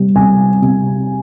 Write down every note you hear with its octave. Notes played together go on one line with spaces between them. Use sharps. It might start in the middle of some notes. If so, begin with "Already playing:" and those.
Already playing: C3 G3
C3 G#5
C3